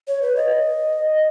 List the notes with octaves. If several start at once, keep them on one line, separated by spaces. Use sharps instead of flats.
C#5
B4
D#5